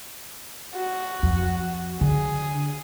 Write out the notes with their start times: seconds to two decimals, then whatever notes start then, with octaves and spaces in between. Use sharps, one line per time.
0.75 F#4
1.23 F2
2.01 D3 G#4